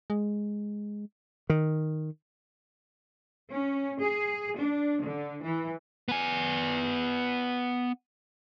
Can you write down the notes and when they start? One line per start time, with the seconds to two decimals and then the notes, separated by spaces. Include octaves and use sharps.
0.10 G#3
1.50 D#3
3.50 C#4
4.01 G#4
4.57 D4
5.02 D3
5.42 E3
6.09 B3 G#5